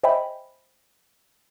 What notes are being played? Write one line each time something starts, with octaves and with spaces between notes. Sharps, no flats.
C5 D#5 E5 G5 G#5 B5